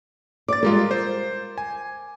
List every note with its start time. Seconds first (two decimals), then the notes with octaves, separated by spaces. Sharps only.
0.48 D5 D6 A6
0.63 G3 G#3 F4 A#4
0.91 C5
1.58 G#5